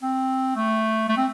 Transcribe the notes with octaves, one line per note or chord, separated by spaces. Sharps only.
C4
A3
A3
C4